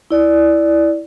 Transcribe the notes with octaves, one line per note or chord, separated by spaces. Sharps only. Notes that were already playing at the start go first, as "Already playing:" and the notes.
E4 D5